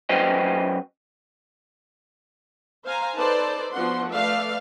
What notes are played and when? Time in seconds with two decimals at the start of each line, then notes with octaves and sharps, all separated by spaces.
0.09 F#2 F#4 B4 C5 D#5 G5
2.85 C5 F5 G#5 A#5
3.18 D#4 A4 B4 C5 D5 A5
3.73 F3 B3 D4 F#4 F#5 C6
4.10 A3 B4 D5 E5 F5